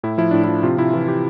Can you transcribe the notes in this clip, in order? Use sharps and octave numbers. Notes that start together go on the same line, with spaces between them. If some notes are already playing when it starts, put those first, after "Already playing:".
A2 E4
F3 E4
A2 D4
F3 E4
C3 F4
C3 E4
E3 F4
G4